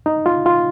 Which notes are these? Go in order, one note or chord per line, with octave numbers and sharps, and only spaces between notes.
D#4
F4
F4